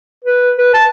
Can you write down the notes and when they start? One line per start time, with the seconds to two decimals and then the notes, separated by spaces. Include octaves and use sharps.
0.25 B4
0.58 B4
0.74 A5